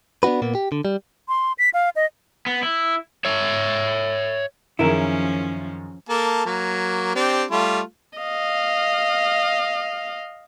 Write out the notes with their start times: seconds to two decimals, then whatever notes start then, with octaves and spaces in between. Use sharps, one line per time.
0.23 B3 D4 D#4 F#4 B4
0.42 A#2 A#3 B3
0.55 G4
0.72 D3
0.85 G3
1.28 C6
1.58 B6
1.74 F5
1.96 D#5
2.46 B3
2.63 E4
3.25 C#5 E5
4.79 F#2 D#3 F3 C#4 E4 G#4 A#4
6.09 A#3 A4 A5
6.46 F#3 A#3
7.15 C4 D4 G4
7.51 G3 A3 F4
8.18 D#5 F5